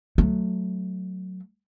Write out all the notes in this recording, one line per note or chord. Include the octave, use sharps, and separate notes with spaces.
F#3 A3